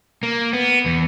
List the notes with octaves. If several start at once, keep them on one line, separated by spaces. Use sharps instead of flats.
A#3
B3
E2